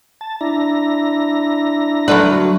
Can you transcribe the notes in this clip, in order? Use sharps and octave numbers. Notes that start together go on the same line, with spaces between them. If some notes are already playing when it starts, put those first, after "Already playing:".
A5
D4 E4 A#5
D3 F#3 A3 A#4 B4